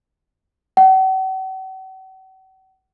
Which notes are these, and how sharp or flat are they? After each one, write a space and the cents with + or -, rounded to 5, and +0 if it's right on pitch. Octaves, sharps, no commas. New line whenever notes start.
F#5 +45